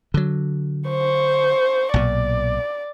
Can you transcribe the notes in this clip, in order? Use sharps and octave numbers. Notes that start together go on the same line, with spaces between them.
D3 F#3
C5 C#6
B1 A#2 D5